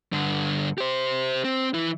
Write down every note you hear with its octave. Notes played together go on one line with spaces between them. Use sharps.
G2 D3
G4 C5
C4
E3 E4